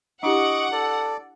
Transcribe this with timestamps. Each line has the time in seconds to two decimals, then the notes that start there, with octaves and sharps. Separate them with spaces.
0.23 D4 E4 G4 D#5 F#5 C#6 D6
0.72 A4 D5